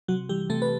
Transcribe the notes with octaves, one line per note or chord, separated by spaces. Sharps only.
C3 F#3 F#4
E3 G3 G4
C3 A3 A4
B4